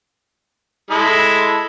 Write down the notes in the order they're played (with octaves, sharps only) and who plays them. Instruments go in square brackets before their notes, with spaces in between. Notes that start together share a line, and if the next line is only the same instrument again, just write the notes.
[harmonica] G#3 E4 A4